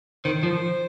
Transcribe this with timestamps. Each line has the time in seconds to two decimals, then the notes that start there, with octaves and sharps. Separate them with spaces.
0.25 D#3 C5
0.43 F3